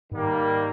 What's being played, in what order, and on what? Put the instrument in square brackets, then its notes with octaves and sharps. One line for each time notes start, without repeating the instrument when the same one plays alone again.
[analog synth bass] G#2 [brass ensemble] D#3 G3 A#3